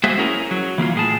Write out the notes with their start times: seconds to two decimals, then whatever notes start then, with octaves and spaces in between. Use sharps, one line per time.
0.04 G#3 A#3 F#4 G#4 C5 E5
0.18 C#4 E4 G#4 A#4
0.51 F#3
0.78 E3 A#3 E4 F4
0.95 A2 G#4 A5